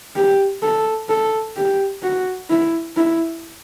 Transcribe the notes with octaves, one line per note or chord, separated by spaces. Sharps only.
G4
A4
A4
G4
F#4
E4
E4